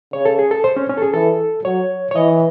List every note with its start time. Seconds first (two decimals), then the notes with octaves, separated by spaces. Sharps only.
0.13 C#3 C#5
0.25 A4
0.39 G#4
0.51 A4
0.64 C5
0.77 C#4
0.89 C#4
0.98 A4
1.02 G#4
1.14 E3 A4
1.65 F#3 C#5
2.11 C#5
2.15 E3 D#5